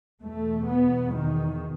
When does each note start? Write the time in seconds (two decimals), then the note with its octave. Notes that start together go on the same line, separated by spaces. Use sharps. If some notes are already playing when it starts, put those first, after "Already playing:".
0.22 E2 B2 A3
0.68 B3
1.13 D#3